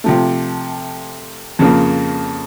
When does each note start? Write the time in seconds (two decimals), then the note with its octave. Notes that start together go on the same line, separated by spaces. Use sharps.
0.04 C3 F3 A3
1.59 F2 C#3 F3 A#3